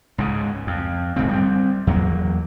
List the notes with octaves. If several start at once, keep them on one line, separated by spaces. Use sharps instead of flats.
C#2 G#2 C#3
F2
D#1 G#2 C#3 C4
G3 A3 C4
E2 F#3 G#3 A#3